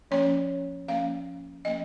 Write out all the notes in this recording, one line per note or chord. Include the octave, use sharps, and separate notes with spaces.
F3 A#3 C#4 C#5
F3 A#3 C#4 F5
F3 A#3 C#4 D#5